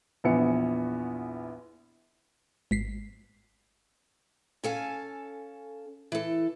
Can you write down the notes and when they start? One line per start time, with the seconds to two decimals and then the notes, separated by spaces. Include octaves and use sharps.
0.24 A#1 E2 B3 C#7
2.71 G#1 B6 C7
4.64 C#4 A4 F5 G#5
6.12 E3 A4